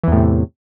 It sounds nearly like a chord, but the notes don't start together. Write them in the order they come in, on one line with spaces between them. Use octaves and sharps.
E3 E2 A2 C3